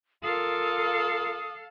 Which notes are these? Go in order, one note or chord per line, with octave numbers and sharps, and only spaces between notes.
F4 A4 A#4 F5 D#6